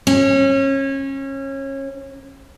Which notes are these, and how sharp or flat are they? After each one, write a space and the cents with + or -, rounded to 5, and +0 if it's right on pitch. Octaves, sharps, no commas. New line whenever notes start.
C#4 -25